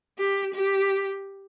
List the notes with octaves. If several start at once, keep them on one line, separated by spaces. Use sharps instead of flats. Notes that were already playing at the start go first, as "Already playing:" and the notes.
G4
G4